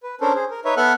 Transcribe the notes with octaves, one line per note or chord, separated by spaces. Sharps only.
B4
C#4 D4 A4 A#4 C5
G#4 C5
A#4
D#4 B4 C#5 E5
B3 A4 E5 F#5 F6 F#6